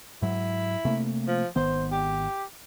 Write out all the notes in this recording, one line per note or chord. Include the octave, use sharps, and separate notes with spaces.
G#2 F#3 E4
C3 A3 A#3
F3
G#1 D#3 B3 C5
G4